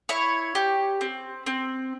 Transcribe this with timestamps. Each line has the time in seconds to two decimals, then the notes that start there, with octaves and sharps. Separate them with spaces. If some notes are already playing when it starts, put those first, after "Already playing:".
0.09 E4 C#5
0.55 G4
1.01 C4
1.46 C4